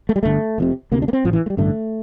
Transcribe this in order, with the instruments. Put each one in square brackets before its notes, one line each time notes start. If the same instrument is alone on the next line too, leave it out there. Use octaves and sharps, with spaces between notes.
[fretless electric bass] A3
G3
G1 F2 D3 A3
F1 F2 C3
D2 C3 A#3
D4
A#3
C4
A1 A2 F3
E3
A3
G3
A1 G2 D3 A3